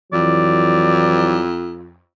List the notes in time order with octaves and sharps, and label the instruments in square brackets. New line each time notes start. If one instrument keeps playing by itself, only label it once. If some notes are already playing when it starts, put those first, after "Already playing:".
[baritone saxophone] F2 [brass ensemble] E3 F#3 [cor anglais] D5